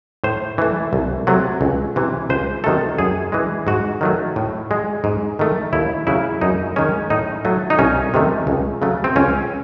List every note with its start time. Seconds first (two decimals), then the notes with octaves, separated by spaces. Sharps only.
0.24 A2 C5
0.58 E3 A3
0.93 C2
1.27 C3 F#3 A3
1.61 C#2
1.96 C3 E3
2.29 C#2 C5
2.64 C3 D#3 F#3 A3 A4
2.98 F#2 G#4
3.32 E3 G#3
3.67 G#2 F#4
4.01 D#3 F#3 A3
4.36 A2
4.71 G#3
5.04 G#2
5.39 D#3 A3
5.73 D#2 E4
6.07 C#3 F#3 E4
6.41 F#2 D#4
6.76 D#3 G#3 C#4
7.10 A2 D#4
7.45 F#3 A3
7.70 D#4
7.79 C2 C#4
8.14 C3 D#3 A3
8.47 C#2
8.82 C#3 F#3 A3
9.04 C4
9.16 C#2 C#4